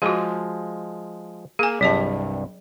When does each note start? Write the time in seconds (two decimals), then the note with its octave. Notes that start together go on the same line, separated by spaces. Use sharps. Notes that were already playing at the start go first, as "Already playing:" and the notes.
0.02 F3 G#3 F#4 G#4
1.59 A#3 G#4 G#5
1.81 C2 G2 F#3 D#5 A5